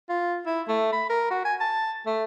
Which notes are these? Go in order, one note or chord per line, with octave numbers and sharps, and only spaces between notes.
F4
E4
A3
B5
A#4
F#4
G#5
A5
A3